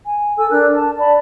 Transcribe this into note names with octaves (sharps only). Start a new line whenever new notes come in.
G#5
A4 G#5 E6
D4 A#4 F#6
A5
D5 A5 B5